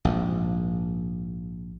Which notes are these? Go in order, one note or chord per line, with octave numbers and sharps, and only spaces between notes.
A#1 G#2